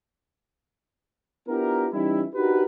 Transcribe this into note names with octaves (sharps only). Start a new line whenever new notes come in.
B3 D4 E4 F4 G4 A#4
E3 G3 C#4 D#4 E4
D4 D#4 F#4 G4 A#4 B4